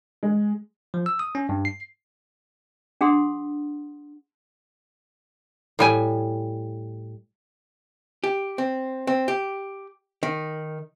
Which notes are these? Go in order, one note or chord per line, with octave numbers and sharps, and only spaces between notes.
G#3
F3
E6
D#6
C#4
G2
C7
D4 G#4 F#5 C6 D#6
A2 G3 G#5
G4
C4
C4
G4
D#3